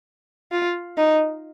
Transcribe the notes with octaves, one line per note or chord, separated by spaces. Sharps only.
F4
D#4